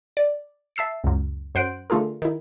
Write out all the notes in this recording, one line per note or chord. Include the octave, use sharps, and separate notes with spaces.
D5
E5 A5 E6 C7 C#7
C#2 F#2
F#2 C5 F#5 D7
D3 A3 F4 G#4 A#4
D#3 E4